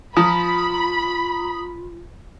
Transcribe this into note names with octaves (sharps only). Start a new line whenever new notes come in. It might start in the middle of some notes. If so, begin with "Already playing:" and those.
F3 F4 A#5 B5 D#6